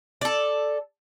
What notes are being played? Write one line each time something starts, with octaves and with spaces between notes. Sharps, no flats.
A4 D5